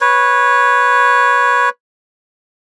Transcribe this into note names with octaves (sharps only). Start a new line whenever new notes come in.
B4 C#5